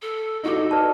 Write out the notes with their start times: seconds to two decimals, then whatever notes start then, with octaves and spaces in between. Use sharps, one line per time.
0.02 A4
0.43 D#4 F#4 A4 D6
0.71 B4 D5 A5